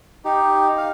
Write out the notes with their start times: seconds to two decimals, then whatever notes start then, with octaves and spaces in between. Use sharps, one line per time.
0.25 D#4 G4
0.77 F5